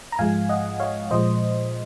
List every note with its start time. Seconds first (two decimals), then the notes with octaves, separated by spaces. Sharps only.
0.12 A#5
0.19 G#2 F3 G#3 F5 G#5
0.49 D#5 F#5
0.80 C#5 F5
1.10 A#2 F3 G#3 C5 D#5